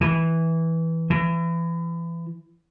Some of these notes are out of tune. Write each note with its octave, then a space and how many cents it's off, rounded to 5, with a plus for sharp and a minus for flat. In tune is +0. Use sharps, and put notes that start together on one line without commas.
E3 -10
E3 +30